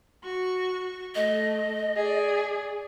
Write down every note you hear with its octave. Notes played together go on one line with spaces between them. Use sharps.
F#4 C#6
A3 D#5
G#4 D5